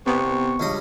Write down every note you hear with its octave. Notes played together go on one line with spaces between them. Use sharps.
C3 B3 C#6
C#2 G2 D#5